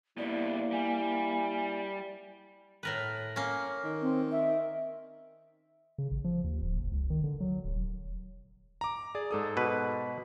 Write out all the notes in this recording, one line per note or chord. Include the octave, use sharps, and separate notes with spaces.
B2 G3 A#3 E4 D5
G3 G#5
A2 A#4 B4
A#3 C#4
D#3
C4
E5
C#3
A1
F3
D#2
D1
F#1
C#2
D#3
D3
F#3
D1
E1
A#5 D6
G#4 D5
G#2 A4 D#6
B2 B4